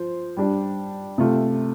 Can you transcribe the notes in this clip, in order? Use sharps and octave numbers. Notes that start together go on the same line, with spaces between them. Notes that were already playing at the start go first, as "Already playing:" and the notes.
Already playing: F3 C5
G3 D4 G4
C3 A3 F4